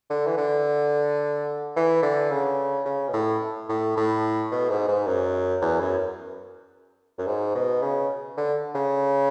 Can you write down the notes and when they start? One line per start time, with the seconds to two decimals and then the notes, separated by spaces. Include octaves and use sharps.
0.10 D3
0.26 E3
0.37 D3
1.76 E3
2.02 D3
2.31 C#3
2.85 C#3
3.09 B2
3.13 A2
3.69 A2
3.96 A2
4.51 B2
4.70 G#2
4.88 G#2
5.07 F#2
5.62 E2
5.80 F#2
7.18 F#2
7.27 G#2
7.55 B2
7.82 C#3
8.37 D3
8.74 C#3